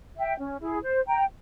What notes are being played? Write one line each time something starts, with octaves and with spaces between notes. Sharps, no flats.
E5 G5
C#4
E4 G#4
C5
G5 A#5